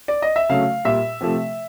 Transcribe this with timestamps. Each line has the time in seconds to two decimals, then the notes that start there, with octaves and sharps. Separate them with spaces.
0.08 D5
0.22 D#5
0.36 E5
0.49 C#3 F#3 A3 F5
0.85 A#2 G3 E5
1.21 C3 F3 A3